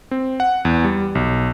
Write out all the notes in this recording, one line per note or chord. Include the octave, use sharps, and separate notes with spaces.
C4
F#5
E2
G3
B1